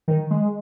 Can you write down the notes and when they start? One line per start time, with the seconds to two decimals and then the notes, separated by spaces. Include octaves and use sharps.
0.08 D#3
0.31 G#3